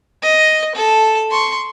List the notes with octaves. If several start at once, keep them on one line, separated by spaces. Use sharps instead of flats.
D#5
A4 A5
C6 C#6